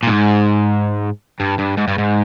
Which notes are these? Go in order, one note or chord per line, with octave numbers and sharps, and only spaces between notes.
A#2
G#2
G2
G2
G#2
G2
G#2